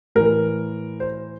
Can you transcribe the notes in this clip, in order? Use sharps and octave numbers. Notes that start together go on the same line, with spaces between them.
A2 E3 A#4
C5